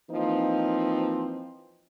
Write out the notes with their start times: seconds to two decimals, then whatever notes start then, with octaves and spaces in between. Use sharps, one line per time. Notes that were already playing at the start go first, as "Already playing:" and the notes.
0.10 E3 F3 A#3 C4 D#4